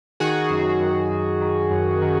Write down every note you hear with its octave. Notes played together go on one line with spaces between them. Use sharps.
D#3 F#4 G#4
F#2
F#2
F#2
D#3
F#2
D#3